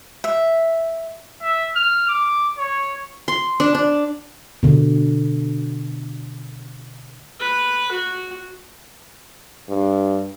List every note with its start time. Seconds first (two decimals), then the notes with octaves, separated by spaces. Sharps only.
0.24 E5
1.42 E5
1.76 F6
2.09 D6
2.58 C#5
3.28 C6
3.60 D4
3.75 D4
4.63 B2 D3
7.40 B4
7.92 F#4
9.70 G2